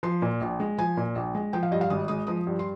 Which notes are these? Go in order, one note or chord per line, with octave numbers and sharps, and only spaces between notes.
F3 C6
A#2
A#1
G#3
F3 G#5
A#2
A#1
G#3
F3 G5
F5
G2 D#5
F5
G#1 D#6
G#3 D#6
F3 D#6
G2
C6